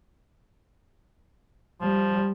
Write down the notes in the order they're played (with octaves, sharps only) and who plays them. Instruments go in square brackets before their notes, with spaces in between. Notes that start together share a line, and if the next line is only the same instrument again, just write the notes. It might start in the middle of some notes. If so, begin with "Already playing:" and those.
[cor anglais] F3 [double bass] G3